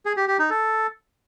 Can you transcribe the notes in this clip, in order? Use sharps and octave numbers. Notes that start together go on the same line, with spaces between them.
G#4
G4
G4
D#4
A4